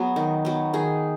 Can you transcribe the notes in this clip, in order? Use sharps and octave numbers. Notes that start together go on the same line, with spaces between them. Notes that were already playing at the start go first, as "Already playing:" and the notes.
Already playing: F#3 B3 G#4
D#3
F#3 B3
D#3 G#4